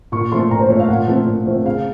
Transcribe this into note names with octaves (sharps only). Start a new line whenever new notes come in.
A#2 C#6
F3 A3 C6
A#2 A#5
C5
F3 A3 C#5
F5
A#2 F#5
F3 A3 C4
A#2
F3 A3 C4
C#3 F5